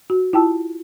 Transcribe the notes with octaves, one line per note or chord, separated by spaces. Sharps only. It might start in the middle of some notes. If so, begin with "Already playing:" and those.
F#4
E4 F4 G5 A5 E6